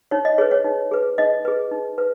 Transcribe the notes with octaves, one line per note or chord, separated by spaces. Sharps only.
D#4 C#5
D#5
G#4 B4 C#5
C#5
D#4
G#4 B4
D#4 D#5
G#4 B4
D#4
B4